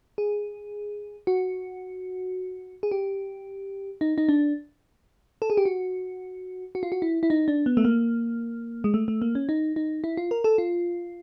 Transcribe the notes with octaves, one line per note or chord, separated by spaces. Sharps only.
G#4
F#4
G#4
G4
D#4
D#4
D4
A4
G#4
G4
F#4
F#4
F4
F#4
E4
E4
D#4
D4
B3
A3
A#3
G#3
A3
A3
A#3
C#4
D#4
D#4
E4
F4
A#4
A4
F4